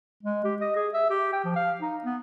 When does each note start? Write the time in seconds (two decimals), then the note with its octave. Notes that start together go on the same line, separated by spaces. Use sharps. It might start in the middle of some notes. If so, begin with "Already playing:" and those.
0.23 G#3
0.44 G4
0.61 D#5
0.76 G#4
0.94 E5
1.10 G4
1.33 G5
1.45 F3
1.56 F5
1.81 D#4
2.04 B3